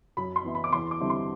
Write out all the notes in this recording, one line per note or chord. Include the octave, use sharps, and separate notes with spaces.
F#2 B5
C6
E3 B3 E4
B5
D6
E2 C6
D6
D3 G3 C4 E4
C6